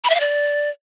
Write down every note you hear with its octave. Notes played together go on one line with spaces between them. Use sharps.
B5
E5
F5
D5